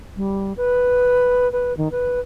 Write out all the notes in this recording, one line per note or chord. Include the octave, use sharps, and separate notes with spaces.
G3
B4
B4
D#3
B4